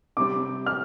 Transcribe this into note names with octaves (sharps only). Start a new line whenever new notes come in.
C3 G3 C4 D6
F6